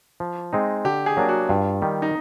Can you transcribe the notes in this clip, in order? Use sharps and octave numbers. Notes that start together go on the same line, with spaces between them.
F3
G#3 C4 D#4
D3 G4
G#4
F#3 A#3 D4
F#4
G2 F4
D#3 G3
D#4